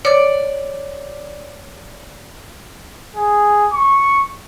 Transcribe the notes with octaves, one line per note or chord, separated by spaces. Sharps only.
C#5 D5 D6
G#4
C#6